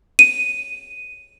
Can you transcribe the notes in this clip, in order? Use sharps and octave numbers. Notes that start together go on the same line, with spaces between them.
D#7